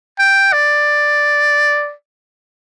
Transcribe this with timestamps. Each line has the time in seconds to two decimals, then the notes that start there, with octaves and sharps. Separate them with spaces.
0.19 G5
0.53 D5